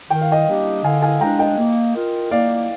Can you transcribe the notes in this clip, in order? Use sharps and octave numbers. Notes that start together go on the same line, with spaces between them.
D#3 G5
F5
D#5 G5
G3 A#3 D4 G4
D3 F5 G#5
F5 G#5
G#3 D4 G5 A#5
D#5 G5
A#3
F4 A#4
A#3 D5 F5